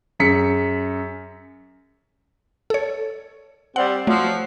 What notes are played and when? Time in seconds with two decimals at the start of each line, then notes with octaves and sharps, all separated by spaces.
0.19 F#2 G#4 B6 C#7
2.70 A4 C#5
3.76 G3 C4 F#5
4.07 F3 F#3 A3